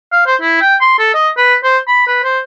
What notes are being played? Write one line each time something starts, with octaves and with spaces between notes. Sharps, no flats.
F5
C5
E4
G5
C6
A4
D#5
B4
C5
B5
B4
C5